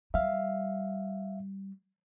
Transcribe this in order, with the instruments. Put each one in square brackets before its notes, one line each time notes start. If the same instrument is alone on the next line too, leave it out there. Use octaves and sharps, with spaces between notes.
[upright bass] G3 [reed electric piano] E5 F5